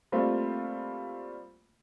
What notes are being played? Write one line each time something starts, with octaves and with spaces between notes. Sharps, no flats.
G3 A3 A#3 C4 F4 C5